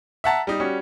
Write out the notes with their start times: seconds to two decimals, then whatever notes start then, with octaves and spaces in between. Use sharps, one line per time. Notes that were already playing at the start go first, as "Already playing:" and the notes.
0.24 E5 F#5 A5 A#5
0.47 G3 D#4
0.60 G3 C#4 F#4